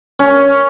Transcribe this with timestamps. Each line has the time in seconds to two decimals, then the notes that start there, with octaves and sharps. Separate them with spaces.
0.19 C#4